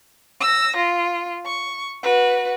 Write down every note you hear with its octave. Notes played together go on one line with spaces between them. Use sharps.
E6 A#6
F4
C#6
F#4 B4